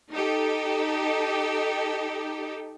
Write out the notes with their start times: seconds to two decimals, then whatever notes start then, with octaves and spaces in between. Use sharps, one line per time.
0.12 D#4 G4 A4